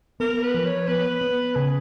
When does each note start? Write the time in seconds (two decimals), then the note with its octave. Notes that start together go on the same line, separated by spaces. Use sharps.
0.20 B3 A#4
0.43 B4
0.54 F3
0.65 C#5
0.88 B3 B4
1.21 B3
1.56 C#3 G#4